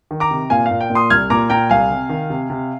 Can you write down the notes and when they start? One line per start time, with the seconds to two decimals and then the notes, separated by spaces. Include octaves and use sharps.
0.11 D#3
0.20 A#5 D6
0.31 C3
0.50 A#2 F5 G#5
0.66 F5
0.71 A#2
0.81 G5
0.90 A#2
0.95 C6 D#6
1.10 C2 F6 G#6
1.30 A#2 A#5 D6
1.50 A#2 G5 A#5
1.70 C2 F5 G#5
1.90 C3
2.09 D#3
2.30 C3
2.50 C3